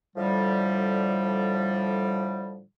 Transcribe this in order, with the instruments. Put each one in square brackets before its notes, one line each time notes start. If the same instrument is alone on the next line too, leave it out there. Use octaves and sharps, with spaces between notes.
[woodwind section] A2 D3 F3 G3